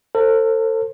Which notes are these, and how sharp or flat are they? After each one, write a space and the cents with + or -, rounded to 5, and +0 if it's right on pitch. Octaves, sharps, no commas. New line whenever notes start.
A4 +40 C5 +20